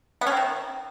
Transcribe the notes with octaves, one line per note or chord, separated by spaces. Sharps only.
B3
C#4
C4
D#3